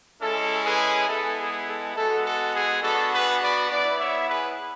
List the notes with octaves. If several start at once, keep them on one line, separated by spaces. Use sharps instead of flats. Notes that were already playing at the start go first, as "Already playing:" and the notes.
G#3 C#4 E4 A4
G#4 B4
G#3 B3 E4 A4
G#4
A4
G#3 B3 F#4 A4
A4
G#4
B3 D4 F#4 A4
G#4 B4
B4 D5
B3 E4 B4 D5
C#5 E5
G#4 B4